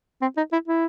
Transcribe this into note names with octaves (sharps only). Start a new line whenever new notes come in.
C4
D#4
E4
E4